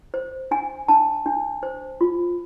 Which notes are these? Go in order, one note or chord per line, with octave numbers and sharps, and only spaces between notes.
C5
D4 G#5
D4 A5
D4
C5
F4